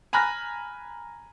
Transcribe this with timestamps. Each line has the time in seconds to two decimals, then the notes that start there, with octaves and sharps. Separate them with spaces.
0.13 G#5 A#5 B5 F6 F#6 A#6